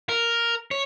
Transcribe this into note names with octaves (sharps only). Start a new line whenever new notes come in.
A#4
C#5